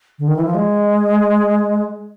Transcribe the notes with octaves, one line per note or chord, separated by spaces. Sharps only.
D3
D#3
E3
F3
G#3